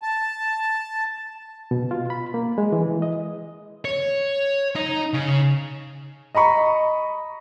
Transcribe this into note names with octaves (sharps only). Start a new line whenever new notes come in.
A5
B2
F4
B5
A#3
G#3
E3
D#5
C#5
D#4
C#3
D#5 A#5 B5 C#6